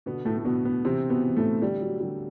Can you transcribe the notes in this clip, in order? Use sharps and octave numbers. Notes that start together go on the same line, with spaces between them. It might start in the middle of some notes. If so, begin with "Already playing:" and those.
B2 D3 B3
A2 A3
A3
B2 D3 B3
B2 B3
C3 E3 C4
B2 B3
E3
A2 A3
D3 G3
F#3
D3 G3